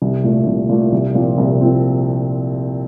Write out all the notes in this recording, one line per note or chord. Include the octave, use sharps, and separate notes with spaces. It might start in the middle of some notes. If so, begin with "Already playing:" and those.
C2
A#2 A3
C2
A#2 A3
C2
A#2 F3 C4
C2
A#2 F3 C4